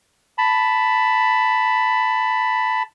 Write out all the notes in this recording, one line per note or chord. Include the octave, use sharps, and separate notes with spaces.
A5 B5